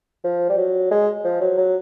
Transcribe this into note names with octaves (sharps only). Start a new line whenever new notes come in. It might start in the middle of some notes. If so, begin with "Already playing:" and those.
F3
G3
F#3
G#3
F3
F#3
F#3